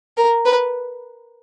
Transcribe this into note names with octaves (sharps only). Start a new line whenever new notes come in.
A#4
B4